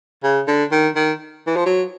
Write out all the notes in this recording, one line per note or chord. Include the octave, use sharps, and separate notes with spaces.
C#3
D3
D#3
D#3
E3
F3
F#3